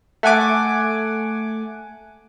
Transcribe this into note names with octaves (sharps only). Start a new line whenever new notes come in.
A3 F#5 G#5 D6